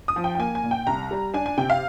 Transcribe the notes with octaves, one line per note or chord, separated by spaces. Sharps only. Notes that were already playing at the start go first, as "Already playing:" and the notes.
D#6
F3
G5
G5
A#3 G#5
G#5
A#2
G5
C2 A#5
G3
D4 G#5
G#5
C3 G5
F5